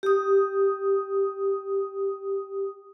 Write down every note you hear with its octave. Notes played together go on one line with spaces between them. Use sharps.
G4 D#6